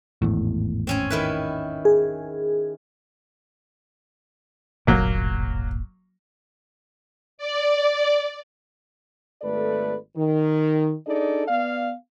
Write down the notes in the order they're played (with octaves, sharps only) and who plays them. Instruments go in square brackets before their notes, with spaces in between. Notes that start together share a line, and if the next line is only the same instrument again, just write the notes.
[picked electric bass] G#1 E2 A2
[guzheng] C4 C#4 G#5
D#3 E4 B4
[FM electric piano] G#4
[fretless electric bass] D1 G1 A#2 [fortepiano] F#3 A#3
[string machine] D5
[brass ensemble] G#1 A3 A4 B4 D5
D#3
D4 D#4 G#4 A4 D5
B3 D5 F5